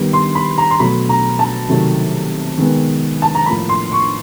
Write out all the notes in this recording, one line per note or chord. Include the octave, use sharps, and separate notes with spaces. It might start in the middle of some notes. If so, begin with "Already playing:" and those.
Already playing: D#3 G3 B3
C6
B5
A#5
C6
B2 F#3 A3 B5
A#5
A5
C3 D#3 F#3 A3
D#3 G#3 B3
A5
A#5
A2 F3 A#3 B5
C6
C#6